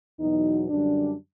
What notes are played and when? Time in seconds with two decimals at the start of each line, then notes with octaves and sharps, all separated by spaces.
0.19 E2 B2 F#3 D#4
0.69 F#2 D3 G3 D4